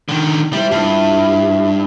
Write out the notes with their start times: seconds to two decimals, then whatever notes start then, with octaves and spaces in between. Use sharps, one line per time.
0.09 D3 D#3
0.53 G3 E4 C5
0.72 G2 E4 F4